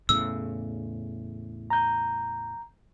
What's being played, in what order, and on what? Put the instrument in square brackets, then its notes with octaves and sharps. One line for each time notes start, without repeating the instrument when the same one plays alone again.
[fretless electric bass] E2 A2 C#3 [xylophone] E6
[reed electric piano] A#5 G6